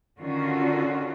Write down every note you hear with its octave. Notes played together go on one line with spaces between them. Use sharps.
D3 D#3 C#4 F4 F#4